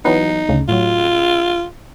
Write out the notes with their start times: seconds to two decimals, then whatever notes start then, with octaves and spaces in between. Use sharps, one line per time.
0.05 E3 F#3 B3 D#4
0.48 D2 C#3
0.68 A2 F#3 F4